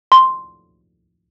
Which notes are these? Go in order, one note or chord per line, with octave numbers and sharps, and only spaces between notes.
C6